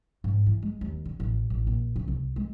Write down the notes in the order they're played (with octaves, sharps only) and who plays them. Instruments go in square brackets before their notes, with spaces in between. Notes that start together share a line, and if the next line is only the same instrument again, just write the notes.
[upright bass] G#2
E3
G#3
D#2
D3
A1
A1
A#1
C#3
C2
G#3